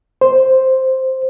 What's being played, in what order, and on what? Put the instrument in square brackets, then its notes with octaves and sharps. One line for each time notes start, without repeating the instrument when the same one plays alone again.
[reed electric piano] C5